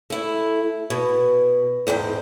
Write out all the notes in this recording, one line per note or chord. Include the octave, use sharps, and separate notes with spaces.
A3 E4
B2
E2 G#2 C3 G5